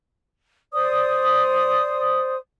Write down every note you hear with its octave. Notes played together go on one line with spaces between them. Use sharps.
C5 D5 D#6